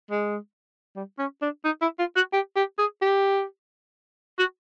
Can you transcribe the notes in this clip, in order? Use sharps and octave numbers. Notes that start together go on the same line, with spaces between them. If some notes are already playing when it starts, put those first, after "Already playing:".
G#3
G3
C#4
D4
D#4
E4
F4
F#4
G4
G4
G#4
G4
F#4